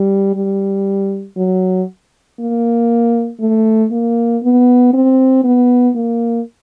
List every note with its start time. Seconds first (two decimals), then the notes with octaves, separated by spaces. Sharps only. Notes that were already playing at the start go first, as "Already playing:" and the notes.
Already playing: G3
0.35 G3
1.37 F#3
2.40 A#3
3.40 A3
3.92 A#3
4.43 B3
4.94 C4
5.44 B3
5.95 A#3